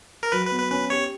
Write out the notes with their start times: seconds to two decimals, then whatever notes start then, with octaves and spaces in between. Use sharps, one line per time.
0.23 A#4
0.32 F#3 B4
0.46 B4
0.52 B3
0.59 B4
0.71 C#4 B4
0.90 G4 C#5